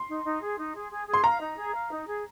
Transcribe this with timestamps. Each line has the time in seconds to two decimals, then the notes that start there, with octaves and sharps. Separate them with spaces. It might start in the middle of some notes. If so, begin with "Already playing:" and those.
Already playing: C6
0.08 D#4
0.25 D#4
0.41 G#4
0.58 D#4
0.74 G#4
0.91 G#4
1.07 G#4
1.14 C6
1.24 F5 A#5
1.41 D#4
1.57 G#4
1.73 F5
1.91 D#4
2.07 G#4